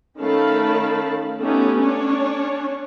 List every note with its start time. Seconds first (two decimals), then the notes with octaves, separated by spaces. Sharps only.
0.20 D#3 A3 C#4 F5 A5 B5
1.41 A3 B3 C#4 D#4 G4
1.81 C#4 D4 C#5